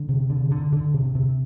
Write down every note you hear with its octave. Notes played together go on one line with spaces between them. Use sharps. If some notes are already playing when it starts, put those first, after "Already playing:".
Already playing: D3
C3
D3
D3
D3
C3
C3